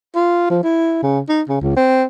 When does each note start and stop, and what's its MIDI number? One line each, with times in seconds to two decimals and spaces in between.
0.15 0.46 65
0.50 0.60 53
0.63 1.00 64
1.03 1.20 49
1.29 1.42 63
1.49 1.59 49
1.61 1.73 37
1.76 2.04 60